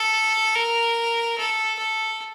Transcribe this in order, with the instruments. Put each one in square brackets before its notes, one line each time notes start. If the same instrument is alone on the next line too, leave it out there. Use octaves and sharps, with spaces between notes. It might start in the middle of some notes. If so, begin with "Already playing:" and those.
Already playing: [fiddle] A4
A#4
A4
A4